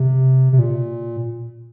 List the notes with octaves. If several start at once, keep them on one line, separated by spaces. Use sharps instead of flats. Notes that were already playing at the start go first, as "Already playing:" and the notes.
Already playing: C3
C3
A#2